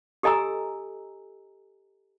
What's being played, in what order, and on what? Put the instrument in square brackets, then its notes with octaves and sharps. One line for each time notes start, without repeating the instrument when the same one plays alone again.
[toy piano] G4 A4 D#5 G#5 A#5 E6